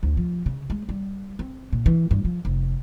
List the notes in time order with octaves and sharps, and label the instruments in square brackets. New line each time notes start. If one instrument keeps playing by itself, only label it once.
[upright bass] D2
F3
C#3
G#3
G3
C4
A#2
E3
G2
F3
F1